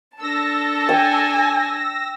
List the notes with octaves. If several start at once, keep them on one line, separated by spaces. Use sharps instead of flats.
D4 A4 A5 E6 A#6
G5 G#5